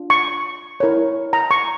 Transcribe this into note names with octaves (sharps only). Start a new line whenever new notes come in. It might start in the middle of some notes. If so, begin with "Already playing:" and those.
Already playing: D4 F4
C#6
E4 A#4 C#5
A#5
C#6